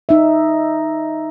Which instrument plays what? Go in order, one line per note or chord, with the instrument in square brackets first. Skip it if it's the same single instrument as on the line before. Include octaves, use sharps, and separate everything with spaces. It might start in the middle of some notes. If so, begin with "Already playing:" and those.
[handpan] D#4 E5